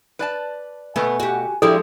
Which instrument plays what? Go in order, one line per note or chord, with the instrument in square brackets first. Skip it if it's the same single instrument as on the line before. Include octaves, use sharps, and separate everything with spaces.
[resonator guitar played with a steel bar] B4 D5 A5
[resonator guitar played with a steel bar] B2 A3 [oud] B3 [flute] G#5
[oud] F#4 G4
[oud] F3 G#3 D4 [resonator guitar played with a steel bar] E4 G4 D5 [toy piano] A4